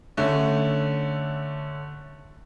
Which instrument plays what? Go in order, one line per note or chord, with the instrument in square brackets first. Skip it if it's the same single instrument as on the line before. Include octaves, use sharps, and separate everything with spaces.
[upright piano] D3 A3 C#4